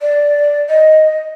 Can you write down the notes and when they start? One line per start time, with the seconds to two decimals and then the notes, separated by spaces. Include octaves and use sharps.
0.01 D5
0.69 D#5